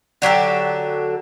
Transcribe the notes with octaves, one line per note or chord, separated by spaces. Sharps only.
D3 F#3 G4 A4